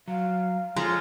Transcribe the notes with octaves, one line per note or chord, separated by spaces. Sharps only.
F#3 F5
F3 G#3 C#4 F4 A4 A#5